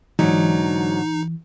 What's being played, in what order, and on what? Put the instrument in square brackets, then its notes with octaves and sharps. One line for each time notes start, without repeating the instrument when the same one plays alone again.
[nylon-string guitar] G#2 D3 F#3 [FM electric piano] E3 [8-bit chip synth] D#4